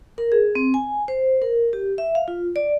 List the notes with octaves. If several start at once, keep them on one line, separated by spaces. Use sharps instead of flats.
A#4
G#4
C4
G#5
C5
A#4
G4
E5
F5
F4
D5